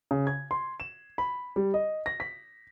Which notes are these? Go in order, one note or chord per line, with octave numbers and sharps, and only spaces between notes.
C#3
G#6
C6
E7
B5
G3
D#5
A#6
B6